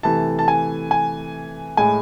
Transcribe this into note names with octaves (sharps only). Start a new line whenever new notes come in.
C3 E3 A3 A5
A5
G#5
G#5
A2 G#3 G#5